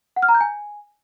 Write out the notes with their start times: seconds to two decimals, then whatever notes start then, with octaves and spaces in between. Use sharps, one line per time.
0.16 F#5
0.22 F6
0.28 A#5
0.35 G6
0.41 G#5